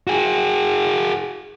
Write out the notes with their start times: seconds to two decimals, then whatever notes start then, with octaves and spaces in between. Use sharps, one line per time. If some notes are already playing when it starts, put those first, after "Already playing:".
0.07 F#4 G#4